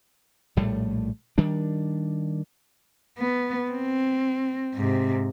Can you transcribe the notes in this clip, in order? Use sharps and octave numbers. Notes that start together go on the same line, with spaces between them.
A#1 A2 G3 A3
D#3 G3 D4
B3
C4
G#2 C3